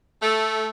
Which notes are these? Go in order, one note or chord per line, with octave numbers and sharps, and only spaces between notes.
A3